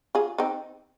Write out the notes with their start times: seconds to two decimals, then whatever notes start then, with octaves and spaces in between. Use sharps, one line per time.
0.15 F4 G#4
0.38 C4 D#4